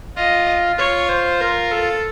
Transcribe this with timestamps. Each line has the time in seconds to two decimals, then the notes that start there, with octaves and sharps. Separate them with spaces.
0.16 F4 D#5
0.78 F4 C#5
1.08 C5
1.41 A#4
1.71 A4